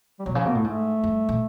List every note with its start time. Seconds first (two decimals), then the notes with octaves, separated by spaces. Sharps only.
0.20 G3
0.26 B2 F#3
0.35 C#3 F3
0.45 B2 A#3
0.55 A2
0.64 G#2 A3
1.04 G2
1.29 A#2